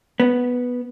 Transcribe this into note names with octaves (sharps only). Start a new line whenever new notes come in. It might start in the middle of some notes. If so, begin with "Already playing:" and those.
B3